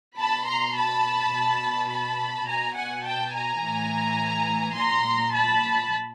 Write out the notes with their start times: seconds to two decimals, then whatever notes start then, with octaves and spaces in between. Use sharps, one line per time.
0.18 B2 A5 B5
0.47 A#5 C6
0.75 A5 B5
1.33 B2
1.89 A5 B5
2.47 B2 G#5 A#5
2.75 F#5 G#5
3.03 G5 A5
3.33 G#5 A#5
3.61 A2 E3
4.75 A#2 A#5 C6
5.33 A5 B5